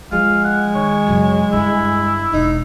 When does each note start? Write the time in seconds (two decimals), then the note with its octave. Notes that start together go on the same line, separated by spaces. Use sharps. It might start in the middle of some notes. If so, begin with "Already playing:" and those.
0.12 F3 G#3 F5
0.44 F#5
0.75 D#3 C#5
1.07 F#2 C#3
1.53 G2 D3 E4
2.33 E1 D#4